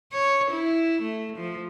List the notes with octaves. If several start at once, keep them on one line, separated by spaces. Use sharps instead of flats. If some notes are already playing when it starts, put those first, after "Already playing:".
C#5
E4
A3
F3